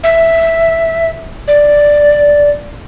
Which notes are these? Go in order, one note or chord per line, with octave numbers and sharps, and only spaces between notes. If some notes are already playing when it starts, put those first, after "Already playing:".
E5
D5